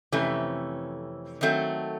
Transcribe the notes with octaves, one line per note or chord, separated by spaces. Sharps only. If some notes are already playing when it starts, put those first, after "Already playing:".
F2 C3 E3 A3 C#4
D#3 F#3 A3 C4